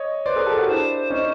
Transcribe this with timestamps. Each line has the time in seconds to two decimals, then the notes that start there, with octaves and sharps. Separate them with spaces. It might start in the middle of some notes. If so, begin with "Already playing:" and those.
Already playing: C#5 D#5
0.25 B4 C5 D5
0.36 G#4 A#4
0.46 G4 A4
0.57 F#4 G#4
0.68 D4 E4 C5
1.10 C#4 D#4